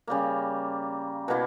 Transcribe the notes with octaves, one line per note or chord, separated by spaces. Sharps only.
C#3 G3 A#3
B2 A#3 E4